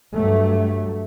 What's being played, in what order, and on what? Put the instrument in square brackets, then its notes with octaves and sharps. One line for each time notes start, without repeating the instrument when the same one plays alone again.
[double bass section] G2 F#3 A3